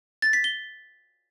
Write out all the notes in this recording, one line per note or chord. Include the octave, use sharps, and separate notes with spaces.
A6
B6
G7